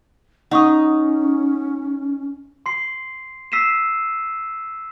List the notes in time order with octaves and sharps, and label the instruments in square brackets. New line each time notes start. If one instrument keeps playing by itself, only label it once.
[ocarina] C#4 [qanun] D#4 [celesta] F#5 C#6 D#6
[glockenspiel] C6 C7
E6 B6 C7 D#7 E7